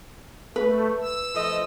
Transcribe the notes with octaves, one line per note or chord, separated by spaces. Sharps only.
A3 B4
E6
F3 A3 D#5